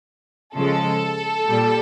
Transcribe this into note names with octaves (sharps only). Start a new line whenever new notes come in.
C#3 F3 G#3 A4
A#2 G3